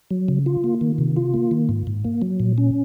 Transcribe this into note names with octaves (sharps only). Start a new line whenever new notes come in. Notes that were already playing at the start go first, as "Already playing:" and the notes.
F#3
C#3
F4
A#3
D#3
C3
F4
A#3
D#3
G#2
G#2
A#3
F#3
A#2
C#4